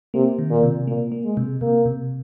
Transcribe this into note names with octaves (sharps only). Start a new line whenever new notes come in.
C3 A#3
D#3
A#2
C3
A#2 A#3
A#3
G#3
C3
C3 A#3
C3